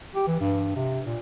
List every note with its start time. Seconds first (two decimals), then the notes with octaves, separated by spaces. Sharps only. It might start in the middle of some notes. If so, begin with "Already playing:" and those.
0.15 G4
0.28 E3
0.40 G2
0.76 C3
1.05 A#2